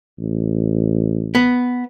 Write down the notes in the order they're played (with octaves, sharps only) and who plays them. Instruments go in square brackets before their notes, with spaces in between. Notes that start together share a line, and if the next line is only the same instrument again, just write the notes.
[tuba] A1
[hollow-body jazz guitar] B3